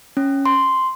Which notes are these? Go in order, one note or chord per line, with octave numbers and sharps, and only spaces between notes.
C#4
C6